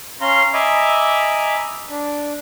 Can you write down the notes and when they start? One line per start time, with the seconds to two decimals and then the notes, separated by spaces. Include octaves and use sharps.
0.21 C#4 F5 A#5 C6
0.53 D#5 E5 G#5 A#5 B5 D6
1.90 D4